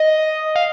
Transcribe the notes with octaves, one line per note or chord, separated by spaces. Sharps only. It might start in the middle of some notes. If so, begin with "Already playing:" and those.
Already playing: D#5
F5